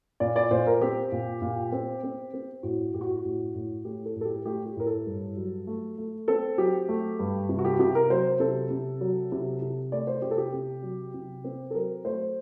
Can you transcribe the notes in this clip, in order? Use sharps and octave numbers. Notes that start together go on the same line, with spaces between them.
A#2 D5
D5
A#2 C5
A#4
C4 G4
A#2
A#2
C4
C4
C4
A2 F#4
A2 G4
F#4
F#4
A2
A2
A3 G4
A4
A2
A4
G4
A3 G4
G4
A2 A#4
A4
G2
F#3
A3
A3
C4 A4
F#3 G4
A3
G2
C3
F#4
G4
F#4
C3 G4
A#4
F#3 C5
C3 A4
C3
F#3
C3
C3
A3 D5
C5
C3 G4
A4
G4
C3
F#3
C3
C4
A4
F#3 A#4
A3 C5